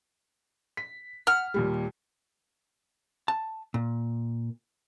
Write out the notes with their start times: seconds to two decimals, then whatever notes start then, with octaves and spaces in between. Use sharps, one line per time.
0.77 B6
1.27 F#5 F6
1.54 D#2 A#2 G3
3.28 A5
3.74 A#2